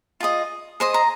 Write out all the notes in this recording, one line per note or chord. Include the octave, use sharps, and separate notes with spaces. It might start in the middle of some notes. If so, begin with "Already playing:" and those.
F4 G#4 D#5
G#4 C5 D#5 C6
A#5